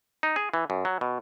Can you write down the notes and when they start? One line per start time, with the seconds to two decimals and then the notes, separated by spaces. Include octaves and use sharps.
0.23 D#4
0.36 G#4
0.54 E3
0.70 F#2
0.85 F#3
1.01 B2